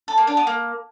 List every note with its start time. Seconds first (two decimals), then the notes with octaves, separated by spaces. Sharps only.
0.08 A4
0.18 A#3
0.27 D4
0.37 B3
0.47 A#3